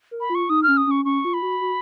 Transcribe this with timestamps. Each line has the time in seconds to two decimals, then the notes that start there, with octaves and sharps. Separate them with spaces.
0.11 A#4
0.20 B5
0.30 F4
0.35 C#6
0.49 D#4 D#6
0.63 F6
0.68 C#4
0.77 D#6
0.87 C#4 C#6
1.05 C#4 C#6
1.25 F4
1.34 B5
1.42 F#4
1.61 F#4